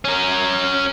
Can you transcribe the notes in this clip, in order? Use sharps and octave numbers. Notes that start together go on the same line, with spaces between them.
C#4 A#4